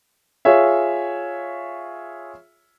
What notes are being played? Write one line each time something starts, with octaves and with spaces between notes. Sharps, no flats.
F4 G#4 C#5 E5